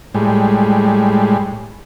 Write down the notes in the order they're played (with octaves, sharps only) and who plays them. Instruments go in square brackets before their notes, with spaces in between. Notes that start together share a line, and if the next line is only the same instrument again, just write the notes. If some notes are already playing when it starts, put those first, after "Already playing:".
[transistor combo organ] A2 G3 G#3